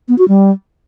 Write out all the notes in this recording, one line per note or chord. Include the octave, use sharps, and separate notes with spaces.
B3
F#4
G3